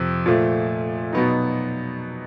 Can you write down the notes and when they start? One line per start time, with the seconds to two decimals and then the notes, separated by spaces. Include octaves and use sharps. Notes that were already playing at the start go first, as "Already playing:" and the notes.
Already playing: F2 C3 F3
0.26 A#2 F3 A3
1.13 B2 F#3 B3 D#4